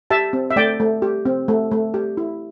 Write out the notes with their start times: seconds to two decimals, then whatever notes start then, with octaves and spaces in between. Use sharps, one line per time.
0.10 G4 E5 A5
0.33 C4
0.51 E5
0.56 A3 D5 G5
0.80 A3
1.02 G4
1.25 C4
1.48 A3
1.71 A3
1.94 G4
2.17 E4